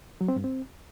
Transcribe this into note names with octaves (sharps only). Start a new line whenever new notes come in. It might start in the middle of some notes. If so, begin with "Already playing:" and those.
F#3
C4
G2
C4